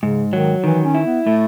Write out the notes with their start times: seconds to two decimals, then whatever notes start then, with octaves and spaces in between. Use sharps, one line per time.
0.02 G#2 C#3
0.33 D#3 F#3
0.64 D#3 E3
0.84 C#4
0.95 E4
1.05 B3
1.26 A2 A3